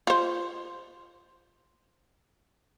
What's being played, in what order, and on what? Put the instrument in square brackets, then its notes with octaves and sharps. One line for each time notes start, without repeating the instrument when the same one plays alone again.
[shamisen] F4 C5